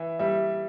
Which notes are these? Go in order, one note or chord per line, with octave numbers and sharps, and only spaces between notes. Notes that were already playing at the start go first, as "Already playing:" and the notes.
Already playing: E3 E5
G3 E5